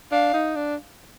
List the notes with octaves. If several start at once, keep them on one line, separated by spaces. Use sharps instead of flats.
D4 F5
D#4
D4